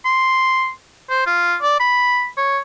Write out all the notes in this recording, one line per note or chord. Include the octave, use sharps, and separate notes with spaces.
C6
C5
F4
D5
B5
C#5